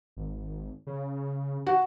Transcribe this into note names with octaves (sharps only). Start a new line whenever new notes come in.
G#1
C#3
F#4